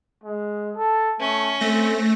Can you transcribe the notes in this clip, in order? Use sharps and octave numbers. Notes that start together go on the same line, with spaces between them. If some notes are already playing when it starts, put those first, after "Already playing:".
G#3
A4
A3 C#4
A3 C4 A#6